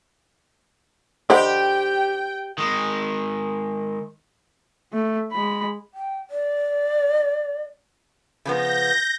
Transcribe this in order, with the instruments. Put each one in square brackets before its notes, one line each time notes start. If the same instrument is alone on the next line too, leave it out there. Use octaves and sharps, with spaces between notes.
[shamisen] D3 D#5 F#5 [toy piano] F4 C5 C6 [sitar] G4 [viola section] G5
[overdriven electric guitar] D#3 G#3
[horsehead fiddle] A3
G#3 B5
[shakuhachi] G5
D5
[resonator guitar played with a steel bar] C#3 F3 B3 [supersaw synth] G6 A#6